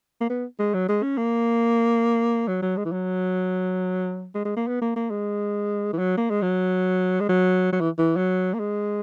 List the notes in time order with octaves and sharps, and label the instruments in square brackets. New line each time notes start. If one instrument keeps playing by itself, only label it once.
[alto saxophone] A#3
B3
G#3
F#3
G#3
C#4
A#3
F#3
F#3
G#3
E3
F#3
G#3
G#3
A#3
B3
A#3
A#3
G#3
E3
F#3
A#3
G#3
F#3
G#3
F#3
F#3
E3
E3
F#3
A#3
G#3